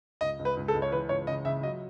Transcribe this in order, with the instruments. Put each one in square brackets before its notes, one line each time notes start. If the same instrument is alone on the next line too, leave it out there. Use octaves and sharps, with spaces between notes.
[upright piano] C#2 [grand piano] D#5
[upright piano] C#2
[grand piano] B4
[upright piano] C#2
[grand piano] A4
[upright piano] C#2
[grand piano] C#5
[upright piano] E3 [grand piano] B4
[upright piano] C#2 [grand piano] C#5
[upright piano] C#3 [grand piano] D#5
[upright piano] C#3 [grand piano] E5
[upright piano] F#3 [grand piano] D#5